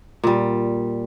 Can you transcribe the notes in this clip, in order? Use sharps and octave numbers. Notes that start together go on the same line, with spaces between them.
A#2 G3